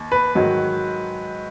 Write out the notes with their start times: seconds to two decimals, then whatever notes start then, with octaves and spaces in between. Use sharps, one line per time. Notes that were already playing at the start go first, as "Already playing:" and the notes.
Already playing: D#2
0.12 B4
0.35 G#2 D#3 F#3